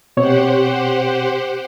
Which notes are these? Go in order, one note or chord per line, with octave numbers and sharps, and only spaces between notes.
B2 C4 G4 C5 C#5 F#5